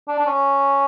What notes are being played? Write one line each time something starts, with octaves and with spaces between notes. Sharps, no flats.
D4
D4
C#4